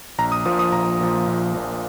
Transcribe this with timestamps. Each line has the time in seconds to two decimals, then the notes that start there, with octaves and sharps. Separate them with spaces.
0.19 A#1 A#5
0.32 D#6
0.45 A#2 F3 D#6
0.59 D#6
0.72 A#1 A#5
1.00 A#2 F3
1.27 A#1
1.54 A#2 F3